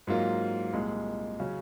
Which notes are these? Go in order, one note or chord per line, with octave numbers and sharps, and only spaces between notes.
G#2 F#3 A#3 F4
C2 A#2 G#3
C#3 F#3 C#4